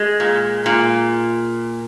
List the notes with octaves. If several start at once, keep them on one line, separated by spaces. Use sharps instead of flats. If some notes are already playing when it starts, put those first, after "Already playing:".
Already playing: G#3
A#2
A#2